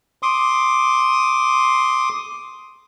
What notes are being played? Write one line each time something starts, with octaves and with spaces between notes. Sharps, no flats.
C6 D6 D#6